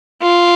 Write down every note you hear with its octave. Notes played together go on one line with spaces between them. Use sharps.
F4